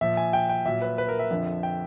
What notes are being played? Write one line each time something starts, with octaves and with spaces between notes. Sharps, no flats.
A#2 F3 E5
G#5
G5
G5
A#2 F#3 E5
B4
B4
A#4
E5
F2 D3 F3
G5